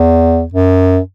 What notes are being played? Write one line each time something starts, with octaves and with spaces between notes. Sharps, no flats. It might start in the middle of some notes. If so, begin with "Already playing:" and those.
Already playing: E2
F#2